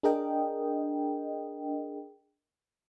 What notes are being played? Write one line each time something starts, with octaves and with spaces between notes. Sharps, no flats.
D4 G#4 A#4 D#5 G5